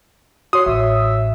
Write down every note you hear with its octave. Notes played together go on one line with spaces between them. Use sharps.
F#4 C#5 C6 D#6
A1 E5